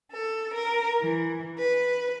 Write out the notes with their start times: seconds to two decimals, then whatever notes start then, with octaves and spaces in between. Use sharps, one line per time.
0.12 A4
0.53 A#4
1.02 E3
1.57 B4